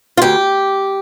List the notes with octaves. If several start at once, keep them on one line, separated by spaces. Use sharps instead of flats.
F4
D2 G4